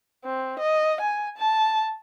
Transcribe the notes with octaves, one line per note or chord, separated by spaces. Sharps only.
C4
D#5
G#5
A5